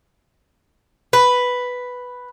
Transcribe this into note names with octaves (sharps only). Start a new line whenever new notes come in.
B4